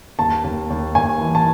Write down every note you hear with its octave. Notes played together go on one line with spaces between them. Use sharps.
D#2 A5
D#2
D#2
D#2 G#5
E3
A5